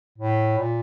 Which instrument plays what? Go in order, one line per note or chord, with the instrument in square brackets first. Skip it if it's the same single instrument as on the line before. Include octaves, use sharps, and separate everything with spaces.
[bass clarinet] A2
A#2